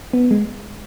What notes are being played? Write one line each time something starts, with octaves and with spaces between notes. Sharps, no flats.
B3
G#3